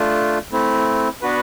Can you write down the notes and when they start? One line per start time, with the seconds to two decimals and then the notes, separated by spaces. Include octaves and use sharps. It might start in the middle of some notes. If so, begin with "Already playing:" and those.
Already playing: A3 D4 F4
0.52 A3 C4 E4
1.22 B3 D4 F#4 B4